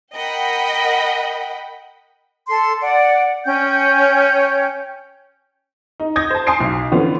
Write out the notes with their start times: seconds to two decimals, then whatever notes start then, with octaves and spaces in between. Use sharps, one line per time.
0.14 A#4 D#5 F#5 G5 B5
2.48 A4 C6
2.82 D5 F#5
3.45 C#4 C#5 G5 G6
6.00 D#4
6.16 D#6 G6 G#6 A#6
6.31 C5 A5
6.46 G#5 A5 C6 D#6 C7 D7
6.60 B1
6.92 D3 E3 F3 B3 C#4